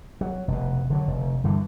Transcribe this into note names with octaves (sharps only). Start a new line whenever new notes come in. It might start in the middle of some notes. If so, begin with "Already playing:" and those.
F#3
F1 B2
D3 F3 F#3
F1
G2 D3 E3